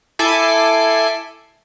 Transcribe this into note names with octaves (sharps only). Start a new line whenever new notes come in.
E4 A4 G#5 D6 C7